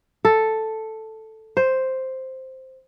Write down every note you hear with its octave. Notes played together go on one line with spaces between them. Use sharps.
A4
C5